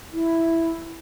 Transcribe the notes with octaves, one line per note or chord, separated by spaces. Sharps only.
E4